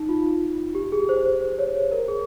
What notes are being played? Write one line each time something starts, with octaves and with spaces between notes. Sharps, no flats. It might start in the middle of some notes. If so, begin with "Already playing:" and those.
Already playing: D#4
F4
G4
G#4
C5
C5
C5
C#5
A#4
G#4